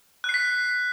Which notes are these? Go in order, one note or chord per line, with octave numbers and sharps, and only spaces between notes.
F#6
C7
B6